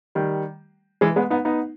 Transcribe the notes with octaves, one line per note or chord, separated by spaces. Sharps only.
D#3 G3
E3 G#3
G#3 B3
B3 D#4
B3 D#4